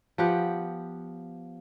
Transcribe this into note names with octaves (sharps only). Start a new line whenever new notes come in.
F3 B3 G4 F#5